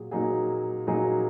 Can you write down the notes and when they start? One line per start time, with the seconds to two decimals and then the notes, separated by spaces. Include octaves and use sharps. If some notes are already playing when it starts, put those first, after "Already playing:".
Already playing: A#2 F#3 G#4
0.11 A#2 F#3 D#4 G#4
0.87 A#2 F#3 D#4 G#4